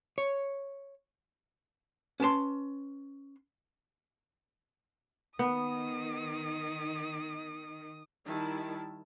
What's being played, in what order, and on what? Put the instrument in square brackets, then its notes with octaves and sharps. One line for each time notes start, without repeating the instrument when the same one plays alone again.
[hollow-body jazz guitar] C#5
C#4 B4 A5 C6
[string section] D#3 [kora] B3 [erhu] D#6
[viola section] D#3 G3 E4 A5